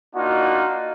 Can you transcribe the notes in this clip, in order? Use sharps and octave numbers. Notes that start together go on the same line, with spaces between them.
A#3 D4 D#4 F4 F#4